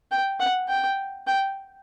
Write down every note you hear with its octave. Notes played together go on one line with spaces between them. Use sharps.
G5
F#5
G5
G5